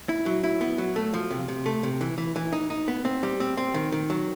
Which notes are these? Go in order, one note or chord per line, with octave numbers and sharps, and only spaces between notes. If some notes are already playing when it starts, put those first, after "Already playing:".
E4
F#3
E4
B3
F#3
A3
F3
C3
C3
A3
C3
E3
E3
E3
D#4
D#4
B3
C4
G3
C4
C4
D#3
D#3
F#3